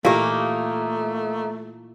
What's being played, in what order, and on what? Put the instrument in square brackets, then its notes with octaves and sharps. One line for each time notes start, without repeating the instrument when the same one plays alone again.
[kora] A#2 E3 [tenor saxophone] A3 [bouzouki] A#3 D#4 [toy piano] G4 F5